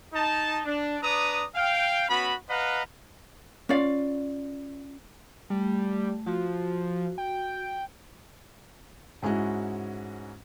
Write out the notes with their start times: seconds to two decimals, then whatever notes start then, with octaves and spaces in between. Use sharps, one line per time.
0.13 D#4 A5
0.65 D4
1.01 D4 B4 D5 A#5 D#6
1.55 F5 G5
2.08 B3 C#4 F#4 B5
2.48 B4 D#5 F5 F#5 A#5 B5
3.69 C#4 F4 D5 F5
5.50 G3 A3
6.26 F3 F#4
7.18 G5
9.22 G#2 G#3 C#4 E4 F#4